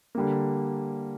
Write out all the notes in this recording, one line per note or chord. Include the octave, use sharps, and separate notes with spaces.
D3 G3 A#3